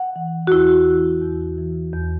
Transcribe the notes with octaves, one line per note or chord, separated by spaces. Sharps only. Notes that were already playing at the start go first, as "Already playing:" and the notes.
Already playing: F#5
E3
F#4
E2 E4
E3
E2
E3
E2